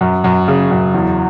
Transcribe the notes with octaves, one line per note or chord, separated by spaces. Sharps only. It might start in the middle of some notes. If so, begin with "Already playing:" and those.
F#2
F#2
C#3
F#2
E2